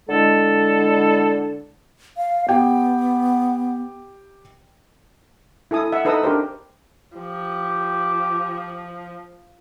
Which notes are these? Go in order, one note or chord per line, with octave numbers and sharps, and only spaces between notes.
D3 G#3 E4 A4
F5
B3 G4 G5
E4 A4 G#5 D#6
E5 F#5
D#4 A4 B4 D#5 D#6 E6
D4 G4 A#4 C5
F3 G4